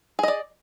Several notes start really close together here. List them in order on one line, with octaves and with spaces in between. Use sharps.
G#4 D#5 D5